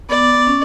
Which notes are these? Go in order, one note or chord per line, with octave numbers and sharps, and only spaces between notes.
B3 D5
C#4